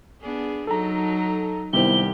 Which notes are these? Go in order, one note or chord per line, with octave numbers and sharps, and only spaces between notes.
B3 D4 G#4
F#3 D#4 A4 A#5
C2 D#3 G3 B3 E4 G4 C5 G7